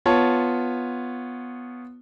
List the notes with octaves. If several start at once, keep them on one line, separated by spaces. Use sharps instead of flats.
B3 F4 C#5 A5